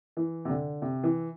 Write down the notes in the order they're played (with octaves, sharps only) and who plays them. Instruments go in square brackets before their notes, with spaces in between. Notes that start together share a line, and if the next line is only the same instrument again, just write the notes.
[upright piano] E3
C3
D3
C3
E3